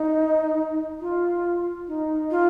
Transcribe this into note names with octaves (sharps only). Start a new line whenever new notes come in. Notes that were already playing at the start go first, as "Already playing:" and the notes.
Already playing: D#4
F4
D#4
F4